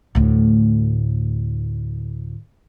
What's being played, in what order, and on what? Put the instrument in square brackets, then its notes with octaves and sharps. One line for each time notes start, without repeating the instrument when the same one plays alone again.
[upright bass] D2 A2